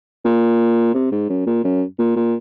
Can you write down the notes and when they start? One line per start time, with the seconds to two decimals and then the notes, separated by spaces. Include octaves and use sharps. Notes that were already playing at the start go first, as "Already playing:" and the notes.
0.25 A#2
0.94 C3
1.12 G#2
1.29 F#2
1.47 A#2
1.64 F#2
1.99 A#2
2.16 A#2